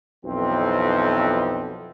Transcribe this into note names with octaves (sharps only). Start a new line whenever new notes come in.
B1 F2 E3 C4